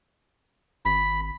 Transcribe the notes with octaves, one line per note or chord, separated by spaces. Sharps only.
G#1 B5